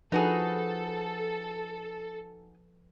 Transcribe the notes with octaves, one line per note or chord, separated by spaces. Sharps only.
F3 D#4 F#4 G#4 A4 B4